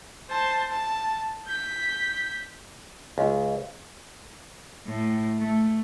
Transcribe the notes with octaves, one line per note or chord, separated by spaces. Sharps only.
C5 A5
A5
G6 B6
C#2
A2
A3